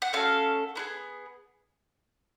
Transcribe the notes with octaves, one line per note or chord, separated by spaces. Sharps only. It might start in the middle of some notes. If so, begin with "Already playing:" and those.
F#5
A3 C#4 F#4 A4 F5
B3 E4 G#4